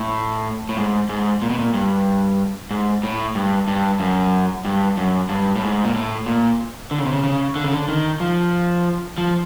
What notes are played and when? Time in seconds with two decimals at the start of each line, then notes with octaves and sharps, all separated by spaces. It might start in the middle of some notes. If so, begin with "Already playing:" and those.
Already playing: A2
0.69 A2
0.77 G#2
1.09 G#2
1.42 A#2
1.50 B2
1.59 A#2
1.74 G2
2.71 G#2
3.03 A2
3.35 G2
3.68 G2
4.00 F#2
4.65 G2
4.97 F#2
5.29 G2
5.56 A2
5.62 G#2
5.85 A#2
5.94 A2
6.26 A#2
6.91 D3
6.99 C#3
7.05 C3
7.12 C#3
7.24 C#3
7.56 D3
7.64 C#3
7.73 D3
7.89 D#3
8.20 F3
9.18 F3